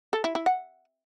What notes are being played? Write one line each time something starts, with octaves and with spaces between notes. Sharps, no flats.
A4
E4
E4
F#5